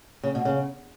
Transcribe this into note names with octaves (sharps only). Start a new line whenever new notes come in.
C#3
B2
C#3